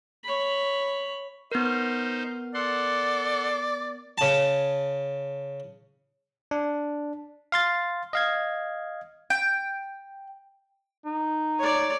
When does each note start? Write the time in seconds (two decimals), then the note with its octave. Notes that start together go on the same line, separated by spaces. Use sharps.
0.24 C#5 B5
1.52 B3 D#4 A#4 C5
2.54 A4 D5 F#5 C6
4.18 C#3 A5
6.51 D4
7.52 F5 C6 A6
8.13 D#5 F5 G#6
9.30 G5
11.05 D#4
11.59 C#5 D5